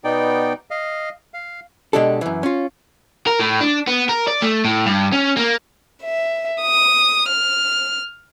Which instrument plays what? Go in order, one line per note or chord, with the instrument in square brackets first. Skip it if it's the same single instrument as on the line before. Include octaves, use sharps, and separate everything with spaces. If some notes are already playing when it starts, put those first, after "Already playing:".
[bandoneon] B2 B3 D#4 D5 G5
D#5 F5
F5
[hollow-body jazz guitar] B2 G#3 D4 G4 A4
F#2 E3
C#4 F4
[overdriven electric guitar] A#4
A2
D4
B3
A#4
D5
A3
A2
G2
C#4
A#3
[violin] E5
D#6
F6